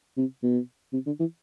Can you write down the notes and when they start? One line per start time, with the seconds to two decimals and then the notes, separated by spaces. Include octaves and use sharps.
0.17 C3
0.43 B2
0.93 C3
1.07 D3
1.20 E3